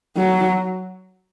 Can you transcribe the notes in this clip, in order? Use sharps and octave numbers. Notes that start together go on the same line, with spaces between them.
F#3